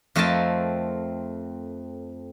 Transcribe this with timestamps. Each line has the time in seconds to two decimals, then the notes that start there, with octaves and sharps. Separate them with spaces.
0.15 F2 A3 C4 A#4 D#5 A5